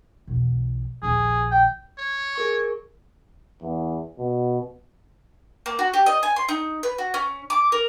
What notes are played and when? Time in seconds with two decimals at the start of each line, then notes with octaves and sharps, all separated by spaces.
0.27 B1 E2
1.02 A#1 D#2 G#4
1.51 G5
1.98 C#5
2.35 G#4 A#4 C#6
3.62 E2
4.18 B2
5.66 A#3
5.79 F#4
5.94 G4
6.06 D#5
6.23 G#5
6.36 C6
6.49 D#4
6.83 B4
6.98 F#4
7.14 C#4
7.50 D6
7.72 A#4